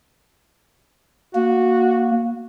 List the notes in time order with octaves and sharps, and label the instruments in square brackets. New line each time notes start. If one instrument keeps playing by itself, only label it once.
[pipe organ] A#3 [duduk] F#4